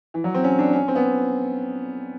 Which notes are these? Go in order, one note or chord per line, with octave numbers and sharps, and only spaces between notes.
E3
F#3
C4
C#4
D4
C#4
C4
B3